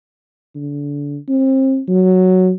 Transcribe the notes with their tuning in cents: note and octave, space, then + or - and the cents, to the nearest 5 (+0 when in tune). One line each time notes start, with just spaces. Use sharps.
D3 -30
C4 +30
F#3 +0